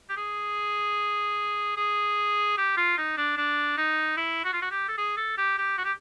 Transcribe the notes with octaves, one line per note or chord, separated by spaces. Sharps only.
G4
G#4
G#4
G4
F4
D#4
D4
D4
D#4
E4
F#4
F4
F#4
G4
A4
G#4
A4
G4
G4
F#4
G4